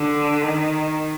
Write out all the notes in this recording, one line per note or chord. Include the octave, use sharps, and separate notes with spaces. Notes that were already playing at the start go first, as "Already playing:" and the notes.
Already playing: D3
D#3